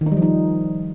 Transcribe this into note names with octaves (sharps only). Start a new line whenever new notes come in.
D#3
D#4
G3
F3
D#4